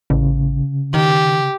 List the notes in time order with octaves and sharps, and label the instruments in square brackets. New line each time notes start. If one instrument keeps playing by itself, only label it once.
[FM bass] A1 [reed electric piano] C#3
[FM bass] D#3 [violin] G4